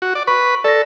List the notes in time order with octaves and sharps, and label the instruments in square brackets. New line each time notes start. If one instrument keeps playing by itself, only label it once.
[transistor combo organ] F#4
D5
[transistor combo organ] B4 [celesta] C#6
[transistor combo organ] A4 [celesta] D5 A#6